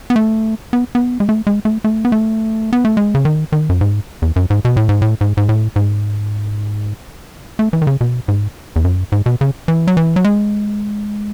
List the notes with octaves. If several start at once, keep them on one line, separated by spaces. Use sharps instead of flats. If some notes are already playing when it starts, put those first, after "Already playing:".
B3
A3
B3
B3
G#3
A3
G#3
A3
A3
B3
A3
B3
A3
G#3
C#3
D#3
D#3
F#2
G#2
E2
F#2
G#2
B2
A2
G#2
A2
G#2
G#2
A2
G#2
A3
E3
D#3
C#3
B2
G#2
E2
F#2
G#2
B2
C#3
E3
F#3
E3
F#3
G#3